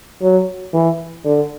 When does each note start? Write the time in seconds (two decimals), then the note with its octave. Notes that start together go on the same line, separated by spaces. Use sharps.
0.23 F#3
0.74 E3
1.25 D3